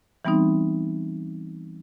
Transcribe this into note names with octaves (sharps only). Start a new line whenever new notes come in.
E3 G3 B3 C4 D#4